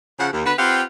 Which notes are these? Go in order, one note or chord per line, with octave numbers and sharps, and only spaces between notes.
C#3 F3 F#5
D#2
D3 B3 F#4 B4
C4 F4 G4 B4 F5 F#5